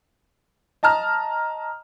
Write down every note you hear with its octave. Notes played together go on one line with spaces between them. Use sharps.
D#5 A5 A#5 F6